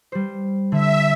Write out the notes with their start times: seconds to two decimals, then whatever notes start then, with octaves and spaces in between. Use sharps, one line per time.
0.12 G3 C5
0.72 D3 E5